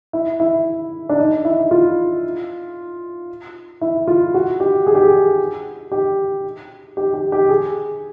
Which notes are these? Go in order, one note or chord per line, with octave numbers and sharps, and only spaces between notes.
E4
E4
D4
D#4
E4
F4
E4
F4
F#4
G4
G#4
G4
G#4
G4
G4
G4
G4
G#4